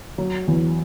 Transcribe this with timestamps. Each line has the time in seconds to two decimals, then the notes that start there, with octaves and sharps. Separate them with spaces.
0.18 F#3
0.47 E2